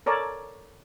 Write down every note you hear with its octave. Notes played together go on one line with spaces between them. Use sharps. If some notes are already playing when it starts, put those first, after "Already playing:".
A4 A#4 C#5 D5 A5